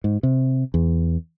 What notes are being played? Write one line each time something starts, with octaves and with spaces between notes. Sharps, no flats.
G#2
C3
E2